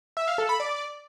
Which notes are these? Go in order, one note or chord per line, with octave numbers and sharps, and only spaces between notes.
E5
F5
A4
B5
D5